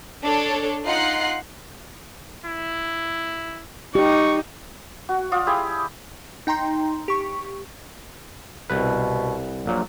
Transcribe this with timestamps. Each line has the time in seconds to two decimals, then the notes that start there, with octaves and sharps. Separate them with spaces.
0.24 D4 A4 C#5
0.85 D#4 F4 F#5 F#6 C7
2.46 E4
3.95 D#4 G4 C#6
5.09 F#4
5.32 F4 D5 D#5
5.47 E4 G4 G#4
6.47 D#4 G5 A#5 C6
7.08 G4 C#6
8.70 C2 B2 B4
9.66 A#1 A#2 F#3